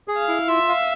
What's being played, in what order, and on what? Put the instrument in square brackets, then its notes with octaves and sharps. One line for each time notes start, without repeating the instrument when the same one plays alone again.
[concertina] G#4
[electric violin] F5
[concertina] E4
[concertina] F4 [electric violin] E5
[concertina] F5